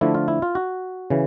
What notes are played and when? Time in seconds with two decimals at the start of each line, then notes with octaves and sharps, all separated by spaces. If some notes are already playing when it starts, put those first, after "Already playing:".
0.01 D3 F3 A3 D4 E4
0.15 F4
0.28 E4
0.42 F4
0.55 F#4
1.10 C#3 E3